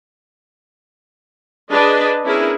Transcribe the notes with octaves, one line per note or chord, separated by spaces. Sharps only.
D4 G#4 B4 D#5
B3 C#4 D4 E4 G#4 A#4